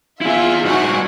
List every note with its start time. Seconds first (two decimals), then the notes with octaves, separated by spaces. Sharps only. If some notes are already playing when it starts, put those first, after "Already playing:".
0.21 E4 F4 G#4 E5
0.65 G2 D#4 F#4 F#5 G#5